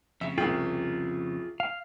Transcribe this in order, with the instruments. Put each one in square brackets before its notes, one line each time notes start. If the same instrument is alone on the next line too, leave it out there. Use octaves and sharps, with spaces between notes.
[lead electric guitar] F2 C#3 [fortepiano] E5
[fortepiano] C2 G5 [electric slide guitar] F4 G#4
[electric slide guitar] F5